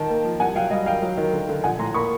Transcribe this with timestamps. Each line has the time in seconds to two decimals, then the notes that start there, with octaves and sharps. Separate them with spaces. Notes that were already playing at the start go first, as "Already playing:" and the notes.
Already playing: D#3 G5 A5
0.10 A#3
0.24 F3
0.40 C2 F#5 G#5
0.56 F#3 F5 G5
0.70 G3 D#5 F5
0.86 D#3 F5 G5
1.02 F#3
1.17 D#3
1.33 D3
1.49 D3
1.64 A#1 F#5 G#5
1.79 A2 A#5 C6
1.94 A#3 B5 C#6